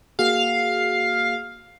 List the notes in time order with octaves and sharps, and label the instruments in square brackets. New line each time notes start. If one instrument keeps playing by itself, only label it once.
[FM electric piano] A#3 F#4 G#4 [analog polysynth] F5